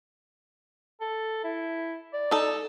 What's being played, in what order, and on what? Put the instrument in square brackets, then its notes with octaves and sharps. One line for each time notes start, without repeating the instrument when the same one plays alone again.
[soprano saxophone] A4
E4
D5
[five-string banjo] D#4 A4